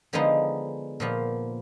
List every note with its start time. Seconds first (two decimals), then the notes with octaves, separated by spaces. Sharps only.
0.13 D3 F3 G#3 B3 D#4
1.00 A#2 F3 B3